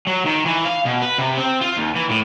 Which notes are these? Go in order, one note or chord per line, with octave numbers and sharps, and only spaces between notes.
F#3
D#3
E3
F5
B2
B4
C3
C4
F4
D#2
E3
A2